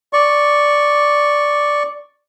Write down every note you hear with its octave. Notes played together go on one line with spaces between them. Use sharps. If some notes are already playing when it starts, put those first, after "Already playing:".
D5 C#6